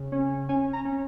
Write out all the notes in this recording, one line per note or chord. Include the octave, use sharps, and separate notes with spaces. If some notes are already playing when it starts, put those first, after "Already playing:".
Already playing: C#3
C#4
C#4 G#5
A#5
C#4